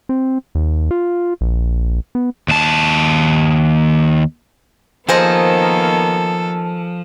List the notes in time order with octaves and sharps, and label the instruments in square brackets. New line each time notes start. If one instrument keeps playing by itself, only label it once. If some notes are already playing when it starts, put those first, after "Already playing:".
[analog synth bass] C4
D#2
F4
A#1
B3
[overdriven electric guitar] D#2 A5
[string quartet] D#3 A#3 B3 [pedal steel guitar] F3 [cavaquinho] G#4 C5 D#5 [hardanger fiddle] A4